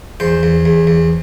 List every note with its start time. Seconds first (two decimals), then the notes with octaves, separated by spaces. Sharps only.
0.20 E2 C5
0.43 E2
0.65 E2
0.87 E2